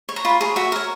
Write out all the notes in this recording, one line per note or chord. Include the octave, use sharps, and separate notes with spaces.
C#5
A#5
F4 B5
G#4 C#5 A#5
F#4 E5
A#4 C#5